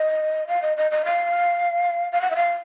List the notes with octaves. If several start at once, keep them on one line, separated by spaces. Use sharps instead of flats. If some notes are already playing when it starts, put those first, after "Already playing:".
Already playing: D#5
F5
D#5
D#5
D#5
F5
F5
F#5
E5
F5